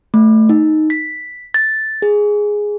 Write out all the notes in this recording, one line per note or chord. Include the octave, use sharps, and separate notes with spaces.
A3
D#4
B6
A6
G#4